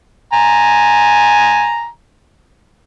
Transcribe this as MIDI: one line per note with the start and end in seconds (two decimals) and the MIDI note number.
0.33 1.87 80
0.33 1.87 82